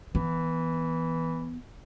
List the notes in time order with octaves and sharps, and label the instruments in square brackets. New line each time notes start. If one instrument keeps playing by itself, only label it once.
[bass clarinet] E3 [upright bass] B3